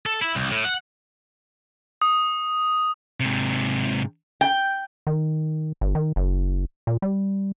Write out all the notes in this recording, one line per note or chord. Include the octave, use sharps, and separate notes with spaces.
A4
E4
C2
A2
F#5
D#6
G#2 C3
G5
D#3
G1
D#3
F#1
A#2
G3